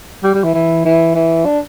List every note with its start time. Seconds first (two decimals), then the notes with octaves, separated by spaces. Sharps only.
0.23 G3
0.34 G3
0.44 E3
0.54 E3
0.85 E3
1.15 E3
1.45 D4